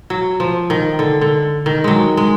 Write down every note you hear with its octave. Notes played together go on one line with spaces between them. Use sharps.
F#3
F3
D#3
D3
D3
D#3
F#3 G#3
G#3